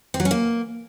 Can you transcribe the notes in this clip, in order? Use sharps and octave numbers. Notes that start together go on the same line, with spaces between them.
C4
F#3
C#4
A#3